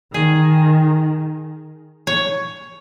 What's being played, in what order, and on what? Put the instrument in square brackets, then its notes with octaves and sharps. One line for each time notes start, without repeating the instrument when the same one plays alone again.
[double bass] D#3 [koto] G#4
[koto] C#5